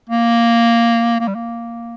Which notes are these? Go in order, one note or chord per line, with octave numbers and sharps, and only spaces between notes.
A#3
A#3
G3
A#3